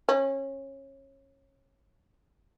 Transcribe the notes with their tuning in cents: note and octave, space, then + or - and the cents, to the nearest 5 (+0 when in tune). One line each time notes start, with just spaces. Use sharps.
C#4 -25